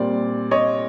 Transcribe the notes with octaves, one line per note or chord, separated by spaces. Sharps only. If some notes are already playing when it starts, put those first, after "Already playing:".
Already playing: A#2 G3 C4 D5
C#5 D#5